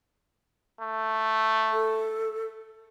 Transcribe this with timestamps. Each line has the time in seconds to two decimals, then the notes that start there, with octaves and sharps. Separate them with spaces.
0.81 A3
1.73 A4